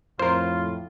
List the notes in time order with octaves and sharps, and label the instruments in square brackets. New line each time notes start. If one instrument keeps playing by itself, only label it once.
[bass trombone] F2 [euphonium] A2 [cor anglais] F4 [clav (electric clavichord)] A#4 C5